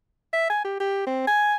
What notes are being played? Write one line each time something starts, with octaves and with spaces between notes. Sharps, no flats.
E5
G#5
G4
G4
C4
G#5